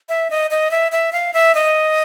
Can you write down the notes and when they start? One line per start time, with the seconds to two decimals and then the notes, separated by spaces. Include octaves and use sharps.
0.09 E5
0.30 D#5
0.51 D#5
0.71 E5
0.92 E5
1.13 F5
1.34 E5
1.55 D#5